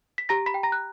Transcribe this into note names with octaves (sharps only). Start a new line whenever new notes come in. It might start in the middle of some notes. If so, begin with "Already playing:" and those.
B6
G4 A#5 A#6
B5 B6
G5
A#5 A#6
F#6